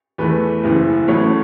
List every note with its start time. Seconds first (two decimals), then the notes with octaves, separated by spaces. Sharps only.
0.18 E2 E3 A3 B4
0.63 F#1 F#2 E3
1.07 A1 A2 F#3 A3 C#5